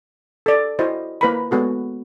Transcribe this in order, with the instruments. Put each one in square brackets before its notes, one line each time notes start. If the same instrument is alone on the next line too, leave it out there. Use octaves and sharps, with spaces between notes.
[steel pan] A4 D5
E4 F#4 C5 D#5
A#3 E4 B4 C5 A#5 B5
G#3 B3 F#4 A4